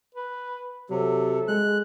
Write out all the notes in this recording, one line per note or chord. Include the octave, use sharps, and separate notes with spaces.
B4
C3 F#3 A4
G#3 F#6